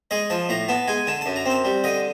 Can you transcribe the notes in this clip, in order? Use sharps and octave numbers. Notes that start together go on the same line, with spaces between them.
G#3 D#5
F3 A5
A2 A#5
B3 A5
G#3 G#5
D3 A5
F#2 A5
A#5
C4 A5
G3
D3 D#5